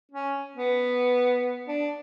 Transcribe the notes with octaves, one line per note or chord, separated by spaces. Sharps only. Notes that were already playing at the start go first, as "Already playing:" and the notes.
C#4
B3
D4